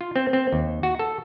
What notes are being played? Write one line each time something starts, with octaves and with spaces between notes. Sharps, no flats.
F4
C4
C4
D#2
F#4
A4